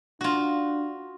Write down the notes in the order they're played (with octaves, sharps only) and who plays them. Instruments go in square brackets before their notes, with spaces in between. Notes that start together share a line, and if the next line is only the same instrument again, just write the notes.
[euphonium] D4 [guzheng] F4 F#4